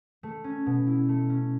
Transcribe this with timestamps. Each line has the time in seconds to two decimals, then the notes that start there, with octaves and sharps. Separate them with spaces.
0.23 A3
0.44 C#4
0.66 B2
0.87 E4
1.09 A3
1.29 C#4